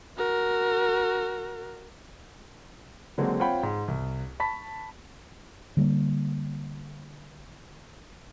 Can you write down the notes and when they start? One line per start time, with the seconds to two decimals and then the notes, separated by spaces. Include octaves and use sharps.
0.17 F#4 A#4
3.18 D3 F#3 G#3 A#3 C4
3.39 C4 F4 C#5 F#5 G5 B5
3.63 G#2
3.88 C2
4.40 A5 B5 C#6 B6
5.77 D3 G3 A3 A#3